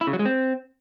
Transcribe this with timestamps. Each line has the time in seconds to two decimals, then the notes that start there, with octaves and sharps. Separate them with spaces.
0.01 E4
0.07 C#3
0.13 F#3
0.19 G#3
0.25 C4